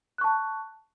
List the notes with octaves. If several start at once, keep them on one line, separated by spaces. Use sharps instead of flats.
A5 C#6 F#6